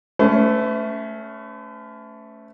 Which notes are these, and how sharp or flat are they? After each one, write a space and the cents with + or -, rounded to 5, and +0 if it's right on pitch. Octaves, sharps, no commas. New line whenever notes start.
A3 +0 C#4 +15 B4 +45